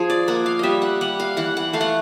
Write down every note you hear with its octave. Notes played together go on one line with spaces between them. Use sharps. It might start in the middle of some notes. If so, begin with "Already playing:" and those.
Already playing: F3 G#4
D5
A#3 F#5
F5
G3 D#5 E5
F#5
G3 F#5
F5
E3 F#5
F#5
A3 F5
F#5